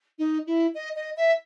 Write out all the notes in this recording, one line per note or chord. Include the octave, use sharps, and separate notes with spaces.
D#4
E4
D#5
D#5
E5